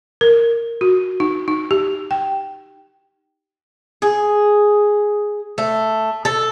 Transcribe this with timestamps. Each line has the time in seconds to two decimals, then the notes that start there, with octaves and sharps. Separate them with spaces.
0.21 A#4
0.81 F#4
1.20 D#4
1.48 D#4
1.71 G4
2.11 G5
4.02 G#4
5.58 A3
6.25 A4